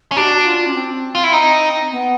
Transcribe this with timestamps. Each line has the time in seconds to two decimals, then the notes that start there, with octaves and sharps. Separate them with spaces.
0.12 C#4
0.16 D4 F#4 G4
0.45 F4
0.66 C#4
0.75 C4
1.15 F4
1.24 E4
1.33 D#4
1.92 B3